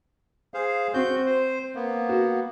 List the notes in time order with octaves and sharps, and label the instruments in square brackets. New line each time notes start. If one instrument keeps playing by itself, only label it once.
[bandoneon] G#4 C5 F5
[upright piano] C4 [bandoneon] F#4 G6
[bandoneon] C5
A#3 B3
[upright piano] F#4